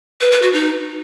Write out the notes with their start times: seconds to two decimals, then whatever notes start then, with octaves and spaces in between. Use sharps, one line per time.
0.21 B4
0.31 B4
0.42 F#4
0.53 D#4